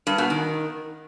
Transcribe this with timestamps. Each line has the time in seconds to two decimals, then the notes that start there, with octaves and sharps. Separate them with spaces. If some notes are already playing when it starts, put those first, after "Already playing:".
0.07 G2
0.18 B2
0.30 D#3